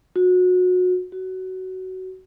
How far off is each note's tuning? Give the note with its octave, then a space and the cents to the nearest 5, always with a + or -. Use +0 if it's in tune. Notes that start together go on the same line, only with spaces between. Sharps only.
F#4 -25
F#4 +15